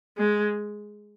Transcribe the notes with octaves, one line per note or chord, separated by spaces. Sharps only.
G#3